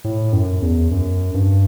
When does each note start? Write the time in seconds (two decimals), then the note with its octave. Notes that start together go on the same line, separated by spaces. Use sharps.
0.04 A2
0.33 F#2
0.62 E2
0.91 F#2
1.34 G2